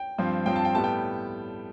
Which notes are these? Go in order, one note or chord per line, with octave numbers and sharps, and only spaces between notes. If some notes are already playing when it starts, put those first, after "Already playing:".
Already playing: G5
G2 F3 C4
G2 F3 C4 G5
A5
G5
A2 G3 B3 A5
G5